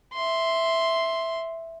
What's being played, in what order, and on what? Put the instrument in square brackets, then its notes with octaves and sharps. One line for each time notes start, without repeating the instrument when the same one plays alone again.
[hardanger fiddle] E5 C6